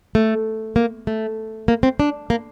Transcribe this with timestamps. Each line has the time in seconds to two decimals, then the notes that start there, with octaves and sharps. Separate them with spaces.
0.15 A3
0.76 A#3
1.07 A3
1.68 A#3
1.83 C4
2.00 D4
2.30 A#3